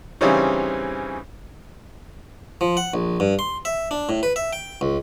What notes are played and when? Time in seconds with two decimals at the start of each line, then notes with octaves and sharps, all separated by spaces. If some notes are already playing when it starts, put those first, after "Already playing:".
0.21 C#3 E3 G3 C4 C#4 D#4
2.61 F3
2.77 F#5
2.94 A#1
3.20 G2
3.39 C6
3.65 E5
3.91 D4
4.09 A2
4.23 B4
4.36 E5
4.53 G5
4.81 C#2